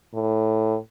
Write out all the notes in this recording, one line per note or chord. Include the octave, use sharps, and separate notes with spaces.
A2